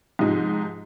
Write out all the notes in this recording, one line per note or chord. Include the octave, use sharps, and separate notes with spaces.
G#2 C3 F3 D#4